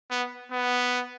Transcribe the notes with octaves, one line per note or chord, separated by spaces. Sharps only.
B3
B3